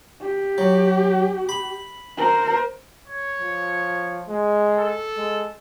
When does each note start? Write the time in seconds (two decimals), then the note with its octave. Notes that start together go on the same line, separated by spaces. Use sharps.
0.21 G4
0.58 F#3
1.49 B5
2.17 A#4 C5
3.08 C#5
3.40 F3
4.29 G#3
4.78 A4
5.17 G#3